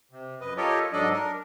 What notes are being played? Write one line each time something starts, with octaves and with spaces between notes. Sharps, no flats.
C3
F#2 B4 D#5
F4 G4 A4 A#4 C#5 D#5
G#2 F#3 D4 A4 D5 D#5
D4 A#4